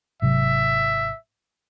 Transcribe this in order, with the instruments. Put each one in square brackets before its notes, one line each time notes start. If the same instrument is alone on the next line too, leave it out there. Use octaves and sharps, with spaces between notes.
[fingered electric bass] G#1 C3 F#3 [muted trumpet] E5